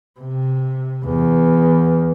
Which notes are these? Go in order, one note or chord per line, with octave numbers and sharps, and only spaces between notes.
C3
E2